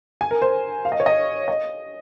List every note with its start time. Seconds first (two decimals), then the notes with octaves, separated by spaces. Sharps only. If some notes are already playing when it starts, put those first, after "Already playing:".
0.21 G#5
0.31 A#4
0.42 C5
0.85 F5
0.92 D#5
1.00 C#5
1.06 D#5
1.48 D#5